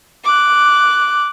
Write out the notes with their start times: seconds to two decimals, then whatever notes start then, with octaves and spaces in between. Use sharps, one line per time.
0.24 D6 F#6